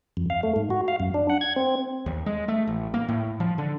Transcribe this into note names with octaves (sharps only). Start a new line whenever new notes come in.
F2
F5
A3
G#2
F#4
F5
F#2
D4
F#5
G#6
C4
D#2
G#3
A3
A1
A#3
A2
F3
D3